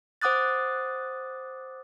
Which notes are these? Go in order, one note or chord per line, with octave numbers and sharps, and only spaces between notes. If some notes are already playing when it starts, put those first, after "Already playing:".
C5 F#5 D6 D#6 F#6 A6